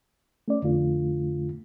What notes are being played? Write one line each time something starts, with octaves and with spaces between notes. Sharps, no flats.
A3 C#4 D5
F2 D3 A3 F4